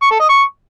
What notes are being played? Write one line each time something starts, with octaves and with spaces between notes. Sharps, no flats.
C#6
A4
D#5
C#6